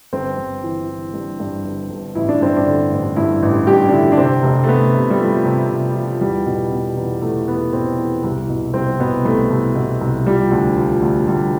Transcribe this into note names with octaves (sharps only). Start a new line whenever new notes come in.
G1 C4
G1
E3
E3
G2
G2
G1
G1
A1 E4
D4
G2 C4
D4
D3
A1
G2 E4
A1
G2 G4
D4
D3 E4
D4
C3 C4
F1
A3
F1 B3
C3
G3
F3 A3
C3
C3
F3
E2 G3
B2
B2
E2
E2 A3
E2 B3
B2 C4
E2
C2
B2
C2 C4
B2 B3
C2 A3
C2
B2
C2
F3 G3
D2
F3
D2
D2 G3